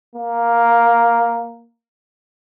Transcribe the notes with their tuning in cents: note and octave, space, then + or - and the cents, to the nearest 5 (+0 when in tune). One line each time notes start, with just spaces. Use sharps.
A#3 +5